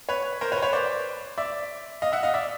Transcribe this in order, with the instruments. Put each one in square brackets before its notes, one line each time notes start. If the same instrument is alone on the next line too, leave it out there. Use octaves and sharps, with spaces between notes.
[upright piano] B4 C#5
A#4 C5
B4 C#5
C5
B4 C#5
C5 D5
D5 E5
D#5 F5
E5 F#5
D#5 F5
D5 E5